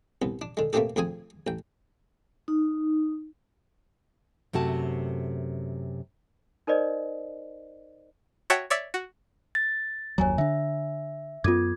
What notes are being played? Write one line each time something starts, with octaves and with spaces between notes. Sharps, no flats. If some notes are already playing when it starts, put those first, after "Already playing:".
C2 B3
D4
D3 G#3
A3 A#3 C4 D4 G4 A4
D2 F3 C4 G#4 G#5
A1 G5
D#4
F#2 C3 A3 F#4 A5
D#4 A#4 C5 D5 D#5
F#4 C#5 E5 F#5 G5 A5
C#5 D5 E5
F#4
A6
F#1 D#2 F#3 C#5 G#5 A#5
D3 D4 E5
F#2 B3 F4 A4 D6 G#6